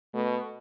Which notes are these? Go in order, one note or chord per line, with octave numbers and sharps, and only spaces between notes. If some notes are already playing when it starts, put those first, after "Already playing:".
B2 A3